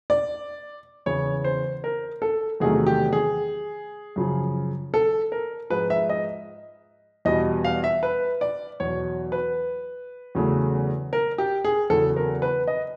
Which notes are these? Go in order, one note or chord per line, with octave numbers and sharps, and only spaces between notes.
D5
E2 C#3 E3 C#5
C5
A#4
A4
E2 C3 D#3 F#3 A3 G#4
G4
G#4
F#2 C#3 F3
A4
A#4
G#2 F3 G#3 B4
E5
D#5
E2 B2 G3 D#5
F5
E5
B4
D5
E2 B2 F#3 C#5
B4
E2 C#3 F#3 A3
A#4
G4
G#4
E2 C#3 F#3 A4
A#4
B4
D#5